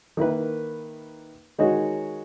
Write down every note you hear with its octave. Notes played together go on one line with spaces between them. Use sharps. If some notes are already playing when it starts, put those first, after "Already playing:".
D#3 A#3 E4 B4
D#3 G#3 D#4 F#4 C#5